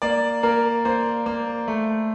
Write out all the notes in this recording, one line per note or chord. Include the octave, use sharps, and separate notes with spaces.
A#3 D5
A#3 A#4
A#3 C5
A#3
A3